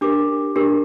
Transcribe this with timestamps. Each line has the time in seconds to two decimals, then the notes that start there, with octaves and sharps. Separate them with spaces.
0.01 D4 G4 A#4 D6
0.55 D4 G4 A#4